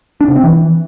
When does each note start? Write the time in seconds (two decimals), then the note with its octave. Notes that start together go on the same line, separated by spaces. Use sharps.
0.21 D4
0.28 C3
0.36 C4
0.43 E3